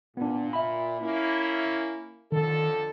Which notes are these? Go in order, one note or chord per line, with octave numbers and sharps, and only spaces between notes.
A#2 B3 D4
E5 B5
A#3 C#4 E4
F2 D3 D#3 A4